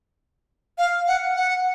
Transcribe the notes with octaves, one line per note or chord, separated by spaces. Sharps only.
F5
F#5
F#5